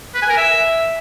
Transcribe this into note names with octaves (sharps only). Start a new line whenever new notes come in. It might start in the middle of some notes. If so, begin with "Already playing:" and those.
B4
G#5
A#4
E5